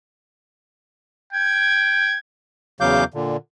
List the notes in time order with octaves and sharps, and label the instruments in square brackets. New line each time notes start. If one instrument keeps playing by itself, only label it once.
[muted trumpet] G5 [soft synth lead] G#6
[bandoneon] E2 C#3 F#3 F5 D6 G6
A#2 D3